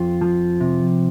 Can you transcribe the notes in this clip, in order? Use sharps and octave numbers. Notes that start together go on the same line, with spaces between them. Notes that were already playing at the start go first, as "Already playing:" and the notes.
Already playing: F2 F4
F3
C3